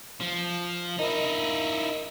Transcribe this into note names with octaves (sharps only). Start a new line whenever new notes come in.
F3
D#4 E4 A#4 D#5